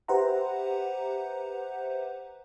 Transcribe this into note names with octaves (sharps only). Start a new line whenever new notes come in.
G4 B4 C5 E5 F#5 A#5